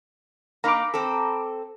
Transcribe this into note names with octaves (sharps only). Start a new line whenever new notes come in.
A#3 D#4 A#5 B5 D6
C4 A4